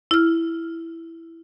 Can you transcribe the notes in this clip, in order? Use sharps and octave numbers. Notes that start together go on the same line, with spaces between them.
E4 F6